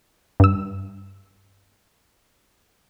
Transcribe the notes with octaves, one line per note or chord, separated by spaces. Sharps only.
G2 E6